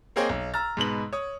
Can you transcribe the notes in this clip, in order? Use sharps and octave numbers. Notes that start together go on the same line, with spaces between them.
A#3 C4 G#4 C#5 D#5 G5
B1
A#5 E6 F6 A6
G#2 B2 B4 F#7
C#5 D#6